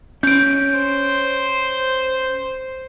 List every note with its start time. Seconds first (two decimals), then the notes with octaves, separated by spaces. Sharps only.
0.23 C#4 G6 D7
0.75 C5